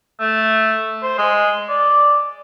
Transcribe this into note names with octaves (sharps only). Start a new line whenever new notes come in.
A3
C5
G#3
D5